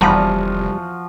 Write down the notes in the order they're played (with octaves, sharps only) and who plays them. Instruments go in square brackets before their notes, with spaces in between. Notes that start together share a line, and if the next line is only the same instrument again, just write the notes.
[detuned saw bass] F1 [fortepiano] E2 A#5 B5 [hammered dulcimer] F3 F#4 [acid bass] G3